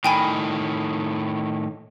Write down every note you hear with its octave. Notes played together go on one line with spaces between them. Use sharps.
A2 D#3 G5 G#5 B5